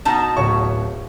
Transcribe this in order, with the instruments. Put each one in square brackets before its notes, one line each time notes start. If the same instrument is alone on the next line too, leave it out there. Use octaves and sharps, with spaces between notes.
[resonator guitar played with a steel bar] B2 D#4 A5
[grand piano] D1 C#5 C#6